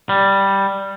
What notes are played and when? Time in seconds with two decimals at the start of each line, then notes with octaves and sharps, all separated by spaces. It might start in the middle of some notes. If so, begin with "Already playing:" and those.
0.09 G3